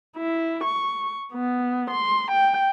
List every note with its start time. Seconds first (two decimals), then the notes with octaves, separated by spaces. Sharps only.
0.18 E4
0.64 C#6
1.33 B3
1.91 C6
2.31 G5